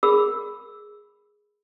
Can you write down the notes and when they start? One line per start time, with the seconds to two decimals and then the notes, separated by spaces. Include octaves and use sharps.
0.03 G#4 A#4 B5 E6